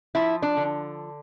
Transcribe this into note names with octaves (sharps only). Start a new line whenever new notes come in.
F3 E4
D4
D3